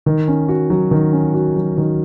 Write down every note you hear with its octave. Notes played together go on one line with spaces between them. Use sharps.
D#3
C#4
F#4
F#3
D#3
C#4
F#4
F#3
D#3